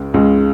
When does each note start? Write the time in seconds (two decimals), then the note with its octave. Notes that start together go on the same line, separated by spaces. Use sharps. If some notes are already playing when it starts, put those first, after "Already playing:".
Already playing: C#2 C#3 G#3
0.14 C#2 C#3 G#3